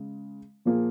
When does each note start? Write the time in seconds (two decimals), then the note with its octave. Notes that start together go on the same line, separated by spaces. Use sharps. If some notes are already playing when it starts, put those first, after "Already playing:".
Already playing: C#3 G#3
0.65 A#2 F3 A#3 F4 G#4